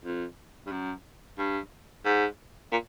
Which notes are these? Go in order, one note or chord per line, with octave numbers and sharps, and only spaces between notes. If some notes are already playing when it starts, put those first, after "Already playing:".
F2
G2
F#2
G2
G#2
A#2